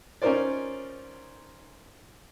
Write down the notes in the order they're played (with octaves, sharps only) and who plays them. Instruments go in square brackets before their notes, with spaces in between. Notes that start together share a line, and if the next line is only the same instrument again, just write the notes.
[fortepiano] C#4 D#4 F4 A#4 C5 D5